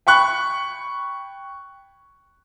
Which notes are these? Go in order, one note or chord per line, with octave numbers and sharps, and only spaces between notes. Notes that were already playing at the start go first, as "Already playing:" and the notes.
G5 B5 C#6 F#6